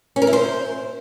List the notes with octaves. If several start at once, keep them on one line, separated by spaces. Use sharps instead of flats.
C#4
A#4
E4
C5